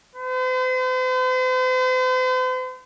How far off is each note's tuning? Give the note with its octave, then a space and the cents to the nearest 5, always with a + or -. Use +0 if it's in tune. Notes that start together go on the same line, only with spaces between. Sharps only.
C5 -45